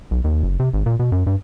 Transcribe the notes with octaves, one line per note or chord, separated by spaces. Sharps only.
B1
D#2
F#1
C3
G#1
A#2
B2
F#2
G2